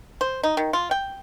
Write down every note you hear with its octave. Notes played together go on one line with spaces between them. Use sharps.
C5
D#4
D#3
F4
G5